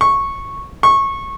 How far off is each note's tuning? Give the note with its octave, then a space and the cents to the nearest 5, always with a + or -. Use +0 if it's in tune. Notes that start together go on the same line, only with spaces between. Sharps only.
C#6 -10
C#6 -20